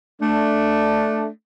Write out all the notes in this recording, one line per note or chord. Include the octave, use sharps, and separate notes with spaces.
A3 D4